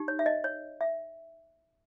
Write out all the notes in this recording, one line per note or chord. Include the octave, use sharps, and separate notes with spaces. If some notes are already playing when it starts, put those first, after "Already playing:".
Already playing: D#4 G4
C#5
E5
D#5
C#5
E5